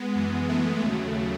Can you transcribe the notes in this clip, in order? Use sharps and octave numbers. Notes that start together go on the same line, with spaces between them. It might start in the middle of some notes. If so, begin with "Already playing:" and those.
Already playing: G#3 B3
F#2 E3
A3
D#2 C#3 F#3